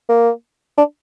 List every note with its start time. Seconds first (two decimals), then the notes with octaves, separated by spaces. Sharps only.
0.09 A#3
0.78 D4